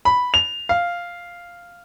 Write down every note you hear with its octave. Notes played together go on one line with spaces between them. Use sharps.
B5
F7
F5